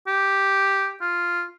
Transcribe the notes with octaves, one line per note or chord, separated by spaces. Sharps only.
G4
F4